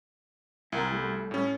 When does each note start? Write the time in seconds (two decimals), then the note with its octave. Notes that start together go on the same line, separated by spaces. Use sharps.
0.72 C2 E4 A#4
0.92 G3 A3
1.31 A2 C#4